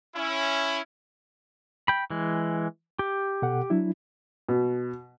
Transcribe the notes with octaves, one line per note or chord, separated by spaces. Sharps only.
C#4 E4
G5 B5
E3 G#3
G4
B2 A4 F#5
F#3 D4 E4
B2